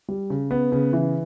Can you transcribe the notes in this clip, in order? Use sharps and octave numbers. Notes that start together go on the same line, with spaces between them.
G3
C#3
B3
C#3
E3